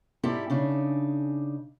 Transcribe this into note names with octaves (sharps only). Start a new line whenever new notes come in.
G#2 C4 E4 G4 A4 D5
C#3 D4 D#4